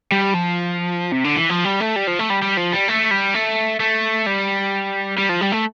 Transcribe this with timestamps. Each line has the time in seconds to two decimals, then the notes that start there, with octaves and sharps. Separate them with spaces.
0.12 G3
0.34 F3
1.12 C3
1.24 D3
1.37 E3
1.50 F3
1.64 G3
1.80 A3
1.96 G3
2.07 F3
2.19 A3
2.30 G3
2.42 G3
2.57 F3
2.73 G3
2.88 A3
3.11 G3
3.34 A3
3.80 A3
4.26 G3
5.18 G3
5.29 F3
5.41 G3
5.52 A3